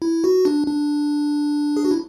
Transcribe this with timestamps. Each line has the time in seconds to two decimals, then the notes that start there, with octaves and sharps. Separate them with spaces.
0.02 E4
0.24 F#4
0.45 D4
0.68 D4
1.77 G#4
1.85 F#4
1.91 E4